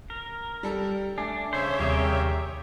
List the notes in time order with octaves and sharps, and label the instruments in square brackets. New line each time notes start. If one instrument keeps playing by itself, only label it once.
[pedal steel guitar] A#4
[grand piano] G3 A4
[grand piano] A3 [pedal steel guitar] D4 [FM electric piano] G#5
[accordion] C#3 C#5 E5 [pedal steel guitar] C5
[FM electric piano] D#2 C3 [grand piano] G3 G#5 D#6 [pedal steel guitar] G4 A#4